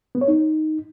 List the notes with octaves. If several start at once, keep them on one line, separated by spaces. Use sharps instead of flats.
B3
C#5
D#4